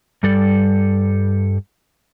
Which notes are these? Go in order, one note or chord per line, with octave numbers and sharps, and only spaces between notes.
G2 G3 A4 D5